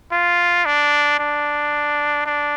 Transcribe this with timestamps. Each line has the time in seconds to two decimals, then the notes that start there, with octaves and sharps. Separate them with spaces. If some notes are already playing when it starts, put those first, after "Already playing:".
0.12 F4
0.66 D4
1.19 D4
2.26 D4